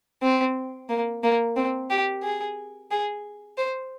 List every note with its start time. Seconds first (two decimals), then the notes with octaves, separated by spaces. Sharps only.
0.22 C4
0.89 A#3
1.23 A#3
1.56 C4
1.90 G4
2.23 G#4
2.91 G#4
3.58 C5